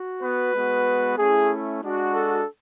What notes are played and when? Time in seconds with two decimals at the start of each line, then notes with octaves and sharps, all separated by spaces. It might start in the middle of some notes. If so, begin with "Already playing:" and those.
Already playing: F#4
0.21 B3 B4
0.54 G#3 B3 F#4
1.18 A3 C#4 E4 G#4
1.82 G#3 D4 F#4
2.13 A4